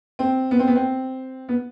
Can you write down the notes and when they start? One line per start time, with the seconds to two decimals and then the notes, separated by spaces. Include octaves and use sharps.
0.19 C4
0.51 B3
0.59 C4
0.68 B3
0.75 C4
1.49 B3